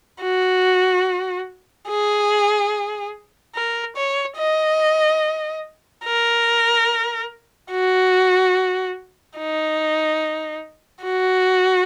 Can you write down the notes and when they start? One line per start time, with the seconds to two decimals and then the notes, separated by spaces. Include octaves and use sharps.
0.22 F#4
1.89 G#4
3.55 A#4
3.96 C#5
4.37 D#5
6.05 A#4
7.71 F#4
9.38 D#4
11.05 F#4